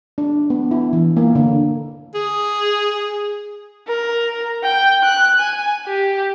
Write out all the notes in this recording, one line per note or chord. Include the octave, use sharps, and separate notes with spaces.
D4
B3
E4
E3
A#3
D3
G#4
A#4
G5
F#6
G#5
G4